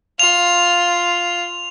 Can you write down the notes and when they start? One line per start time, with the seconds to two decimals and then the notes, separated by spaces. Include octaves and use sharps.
0.19 F4 F7